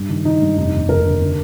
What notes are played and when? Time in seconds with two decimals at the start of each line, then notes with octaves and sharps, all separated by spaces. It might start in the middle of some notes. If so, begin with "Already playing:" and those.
Already playing: G2
0.09 D#3
0.25 D#3 D#4
0.42 G2
0.57 F1 D#4
0.73 D#2
0.89 F1 A#4
1.05 D3
1.21 D3